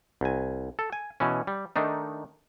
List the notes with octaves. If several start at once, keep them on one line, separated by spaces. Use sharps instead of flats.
C2 G#5
A4
G#5
B2 E3 C#4
G3
D#3 A3 D4 D#4